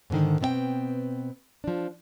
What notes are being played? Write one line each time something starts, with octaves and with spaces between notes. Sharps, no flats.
G#2 B2 D3 D#3
B2 B3 C4 D#5 G5
F3 D4